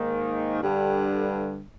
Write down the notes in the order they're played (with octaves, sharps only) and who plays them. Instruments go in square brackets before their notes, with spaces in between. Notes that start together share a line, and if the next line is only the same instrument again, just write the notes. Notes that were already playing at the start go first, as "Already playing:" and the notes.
Already playing: [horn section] G#2 D#3 A#3
G2 D3 G3